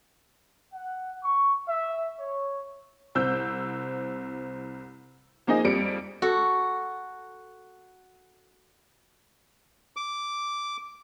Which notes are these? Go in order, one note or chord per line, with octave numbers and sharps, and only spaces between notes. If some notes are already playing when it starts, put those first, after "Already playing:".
F#5
C#6
E5
C#5
C2 C4 E6 G6
F3 A#3 D#4 G#4 D#5
F2 G3 C#7 D7
F#4 A4
D6